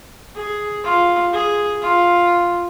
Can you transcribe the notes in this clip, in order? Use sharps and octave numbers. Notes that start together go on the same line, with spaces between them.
G#4
F4
G#4
F4